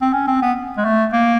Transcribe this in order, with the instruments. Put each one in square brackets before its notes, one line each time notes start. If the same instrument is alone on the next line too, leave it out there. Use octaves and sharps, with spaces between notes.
[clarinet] C4
C#4
C4
B3
G#3
A3
A#3